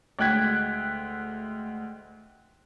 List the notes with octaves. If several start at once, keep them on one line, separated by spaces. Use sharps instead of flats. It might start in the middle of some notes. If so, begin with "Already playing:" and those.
D2 G#3 G5 F#6 G#6 B6